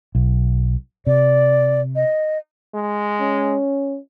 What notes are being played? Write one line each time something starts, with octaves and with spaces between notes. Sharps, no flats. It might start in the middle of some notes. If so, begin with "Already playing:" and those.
B1
C3 D5
D#5
G#3
C#4